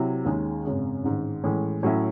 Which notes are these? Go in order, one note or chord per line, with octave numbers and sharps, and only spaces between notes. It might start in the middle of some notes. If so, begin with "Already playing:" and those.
Already playing: C3 F#3 E4
D#2 D#3 G#3 C#4 G#4
G#1 F#2 C#3 G#3
A1 G#2 D#3
A2 E3 G#3 C#4
A2 F#3 C#4 E4